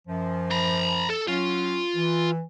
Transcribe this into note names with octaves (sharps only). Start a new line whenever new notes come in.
F#2 F3
A#5 B5
A4
F#3 C#4 F4
E3